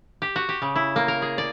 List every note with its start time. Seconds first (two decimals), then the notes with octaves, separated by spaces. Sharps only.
0.22 G4
0.36 F#4
0.49 G4
0.62 C#3
0.76 E4
0.96 A#3
1.08 A#4
1.22 G#4
1.38 D5